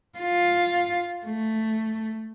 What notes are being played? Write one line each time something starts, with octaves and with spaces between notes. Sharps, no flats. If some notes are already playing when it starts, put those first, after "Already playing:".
F4
A3